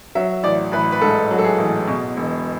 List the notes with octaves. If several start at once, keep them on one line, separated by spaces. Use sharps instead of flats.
F#3 E5
A1 D5
A1 B4
B4
G#2 A4
F#3
A4
G#4
A1
B2
E1